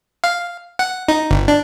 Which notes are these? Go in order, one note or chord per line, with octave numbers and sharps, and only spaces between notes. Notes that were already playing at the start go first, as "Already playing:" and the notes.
F5
F#5
D#4
G1
D4